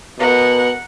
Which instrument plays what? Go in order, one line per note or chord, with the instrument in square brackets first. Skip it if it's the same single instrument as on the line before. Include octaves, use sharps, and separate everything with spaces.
[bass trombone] B2 [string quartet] A#4 F#5